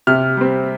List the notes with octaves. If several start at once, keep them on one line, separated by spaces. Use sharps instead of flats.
C3 F6
G3 C4